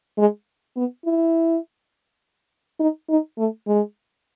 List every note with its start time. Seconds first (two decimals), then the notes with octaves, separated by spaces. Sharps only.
0.18 G#3
0.76 B3
1.05 E4
2.79 D#4
3.09 D#4
3.38 A3
3.67 G#3